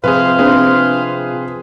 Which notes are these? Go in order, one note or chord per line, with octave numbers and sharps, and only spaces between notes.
C3 F3 G#4 B4 C5 F5
C4 D4 G#4 B4